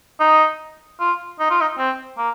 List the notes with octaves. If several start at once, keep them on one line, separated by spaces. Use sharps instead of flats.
D#4
F4
D#4
F4
D#4
C4
A#3